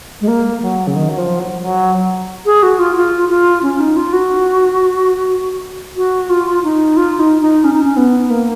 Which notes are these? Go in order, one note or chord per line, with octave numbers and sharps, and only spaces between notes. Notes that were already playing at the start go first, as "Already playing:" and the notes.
G#3
A#3
F#3
C#3
D#3
F#3
F3
F#3
F#3
G#4
F#4
F4
F4
F4
C#4
D#4
F4
F#4
F#4
F4
D#4
F4
D#4
D#4
C#4
D#4
C#4
B3
A#3